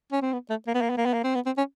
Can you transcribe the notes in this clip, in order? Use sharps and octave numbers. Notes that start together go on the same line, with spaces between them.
C#4
C4
B3
A3
A#3
B3
A#3
B3
A#3
B3
A#3
C4
B3
C4
C#4